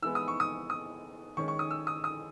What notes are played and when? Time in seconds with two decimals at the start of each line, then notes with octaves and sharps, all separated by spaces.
0.02 E3 G#3 B3 E6
0.15 D#6
0.28 C#6
0.40 D#6
0.70 D#6
1.37 D#3 G#3 C#4 C#6
1.48 C#6
1.59 D#6
1.71 E6
1.87 D#6
2.04 D#6